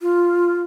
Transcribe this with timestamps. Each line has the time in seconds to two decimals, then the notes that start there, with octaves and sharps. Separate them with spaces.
0.01 F4